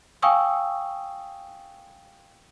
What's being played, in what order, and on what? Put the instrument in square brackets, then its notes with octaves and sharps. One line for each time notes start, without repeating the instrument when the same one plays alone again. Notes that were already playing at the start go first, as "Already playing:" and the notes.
[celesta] F5 G5 G#5 C#6 D#6 E6